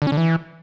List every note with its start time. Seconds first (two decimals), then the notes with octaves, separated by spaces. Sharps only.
0.02 D3
0.07 C#4
0.12 D3
0.17 E3